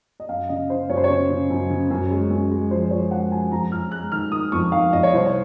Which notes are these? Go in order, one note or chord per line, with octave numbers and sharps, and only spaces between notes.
D#5
F#2 F5
C#3 D#5
C#3 C5
F#2 C#5
C5
C#5
C#3
C#3
F#2
C#3
F#2
G#3
F#2
G#3
F3 C5
F3 C#5
G#3 F#5
F3 G#5
F2 A#5
F2 F6
G#3 F#6
D#3 F6
D#3 D#6
F2 C#6
D#3 F5
F2 D#5
C#5
C2 C5
C#5